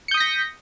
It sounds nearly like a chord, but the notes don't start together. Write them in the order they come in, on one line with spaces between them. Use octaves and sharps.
C#7 G6 D#6 B6 A#6